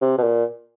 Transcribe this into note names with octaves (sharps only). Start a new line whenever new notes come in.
C3
B2
A#2